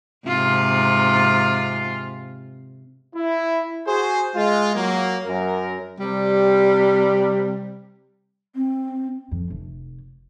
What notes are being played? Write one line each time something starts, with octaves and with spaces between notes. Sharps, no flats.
G#2 C3 F4
E4
F#4 G#4 C5
G#3 F4
F#3 A#3
F#2 A#4
C3 G3
C4
F2
F1